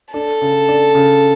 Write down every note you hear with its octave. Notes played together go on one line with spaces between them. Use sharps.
D4 A4
C#3
D4
C#3